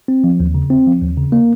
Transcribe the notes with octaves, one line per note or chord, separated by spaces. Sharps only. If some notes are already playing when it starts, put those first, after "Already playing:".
C4
F3
D#2
C#3
C4
F3
D#2
C#3
A#3